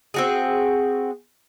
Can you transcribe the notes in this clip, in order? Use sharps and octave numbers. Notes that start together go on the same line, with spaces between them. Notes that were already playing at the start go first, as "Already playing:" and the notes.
C4 F#4 G#4